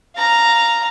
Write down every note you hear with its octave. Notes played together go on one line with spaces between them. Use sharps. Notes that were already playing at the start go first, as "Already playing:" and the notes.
F5 A#5